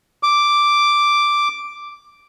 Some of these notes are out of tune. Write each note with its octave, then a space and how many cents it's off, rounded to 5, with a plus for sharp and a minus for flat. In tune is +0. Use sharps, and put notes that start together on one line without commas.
D6 +0